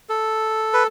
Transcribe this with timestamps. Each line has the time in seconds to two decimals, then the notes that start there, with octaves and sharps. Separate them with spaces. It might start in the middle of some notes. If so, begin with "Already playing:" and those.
0.09 A4
0.73 B4